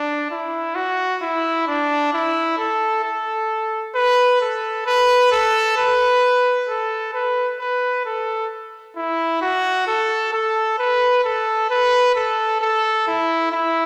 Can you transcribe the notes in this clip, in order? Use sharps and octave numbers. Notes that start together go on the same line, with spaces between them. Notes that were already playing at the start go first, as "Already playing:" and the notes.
Already playing: D4
E4
F#4
E4
D4
E4
A4
A4
B4
A4
B4
A4
B4
A4
B4
B4
A4
E4
F#4
A4
A4
B4
A4
B4
A4
A4
E4
E4